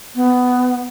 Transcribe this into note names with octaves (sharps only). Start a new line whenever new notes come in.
B3